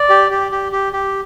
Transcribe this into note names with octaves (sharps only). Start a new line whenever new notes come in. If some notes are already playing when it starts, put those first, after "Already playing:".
Already playing: D5
G4
G4
G4
G4
G4